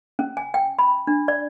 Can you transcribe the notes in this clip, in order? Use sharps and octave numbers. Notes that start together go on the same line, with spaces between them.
C#4
G#5
G5
B5
D4
D5